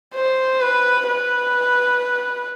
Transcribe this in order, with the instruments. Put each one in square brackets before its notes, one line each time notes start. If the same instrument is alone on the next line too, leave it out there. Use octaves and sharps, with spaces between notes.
[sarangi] C5
B4
B4